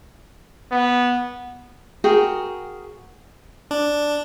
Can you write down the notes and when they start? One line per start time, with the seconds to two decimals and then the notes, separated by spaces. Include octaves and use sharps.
0.72 B3
2.04 F#4 G#4 A#4 G5
3.71 D4